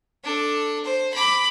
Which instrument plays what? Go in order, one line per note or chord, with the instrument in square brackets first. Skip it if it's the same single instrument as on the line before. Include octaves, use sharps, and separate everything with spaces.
[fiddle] D4 A4
C5
B5 D6